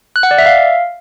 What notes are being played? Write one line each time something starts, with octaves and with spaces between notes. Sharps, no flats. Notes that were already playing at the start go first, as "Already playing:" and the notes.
F#6
F#5
D5
E5
F5